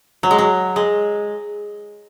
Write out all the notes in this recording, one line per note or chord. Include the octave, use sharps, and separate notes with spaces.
F#3
G#3
F#3
G#3